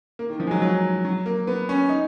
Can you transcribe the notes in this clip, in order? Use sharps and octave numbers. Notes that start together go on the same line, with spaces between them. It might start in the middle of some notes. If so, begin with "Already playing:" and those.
A#3
D#3
F3
G#3
F#3
F#3
F#3
A#3
B3
C#4
D#4